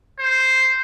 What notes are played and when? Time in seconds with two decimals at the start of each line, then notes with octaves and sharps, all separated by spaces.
0.20 C5